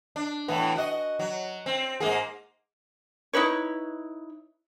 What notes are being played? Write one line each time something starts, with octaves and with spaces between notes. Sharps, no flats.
D4
A2 E3 B3
F#4 D#5
F#3
C4
G#2 A#3 G#4
D#4 E4 B4 C#5